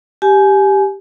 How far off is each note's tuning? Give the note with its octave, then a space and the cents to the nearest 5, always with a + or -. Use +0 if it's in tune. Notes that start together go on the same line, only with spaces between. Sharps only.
G4 +0 G#5 +20